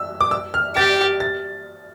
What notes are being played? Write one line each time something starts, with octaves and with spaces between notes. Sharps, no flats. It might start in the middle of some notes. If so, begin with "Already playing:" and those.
Already playing: E6
D6
E6
F6
G4 A6
A6